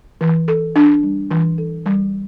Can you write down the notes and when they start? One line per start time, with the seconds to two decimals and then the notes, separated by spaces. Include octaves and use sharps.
0.21 E3
0.48 A4
0.76 D4
1.03 G3
1.31 E3
1.58 A4
1.86 G3